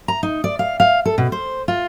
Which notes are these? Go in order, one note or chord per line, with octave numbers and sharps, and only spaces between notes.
A#5
D#4
D5
F5
F5
A4
B2
C5
F4